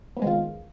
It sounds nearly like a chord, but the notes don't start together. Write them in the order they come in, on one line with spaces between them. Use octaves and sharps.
B3 C3 G#3 D#3 F4